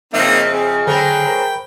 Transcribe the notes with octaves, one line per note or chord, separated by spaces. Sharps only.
F2 C#3 A#3 C4 D#4 E5 E6
C4 G#4
D3 F#3 C4 A4 C5 G5 B5
A#4 C5 A#5